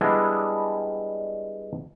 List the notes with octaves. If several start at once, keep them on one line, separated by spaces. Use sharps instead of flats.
G3 G#3 B3 D4 E4